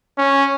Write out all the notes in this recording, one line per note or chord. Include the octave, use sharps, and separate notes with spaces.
C#4